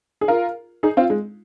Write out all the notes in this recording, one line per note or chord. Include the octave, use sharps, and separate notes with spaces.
G#4
F4 A#4
D#4 G#4
C4 F4
G#3